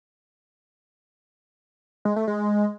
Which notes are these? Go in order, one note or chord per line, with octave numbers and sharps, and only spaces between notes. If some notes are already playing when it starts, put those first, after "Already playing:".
G#3
A3
G#3